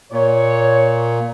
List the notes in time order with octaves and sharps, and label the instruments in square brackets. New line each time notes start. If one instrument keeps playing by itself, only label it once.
[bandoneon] A#2 [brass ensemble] C#5